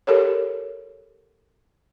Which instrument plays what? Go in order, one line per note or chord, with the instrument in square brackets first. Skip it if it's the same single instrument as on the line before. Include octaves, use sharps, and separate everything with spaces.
[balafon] G4 A4 A#4 C#5